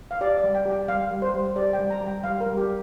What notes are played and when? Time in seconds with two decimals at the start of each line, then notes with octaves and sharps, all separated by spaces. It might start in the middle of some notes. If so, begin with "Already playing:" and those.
0.11 F5
0.21 G4 D5
0.38 D5
0.44 G3
0.55 G5
0.66 G4
0.71 G5
0.88 G3 F5
1.11 G3
1.22 C5
1.34 G3
1.56 G4 D5
1.73 G5
1.79 G3
1.90 A#5
2.01 G3
2.06 G5
2.24 G3 F5
2.41 A#4
2.46 G3
2.57 G4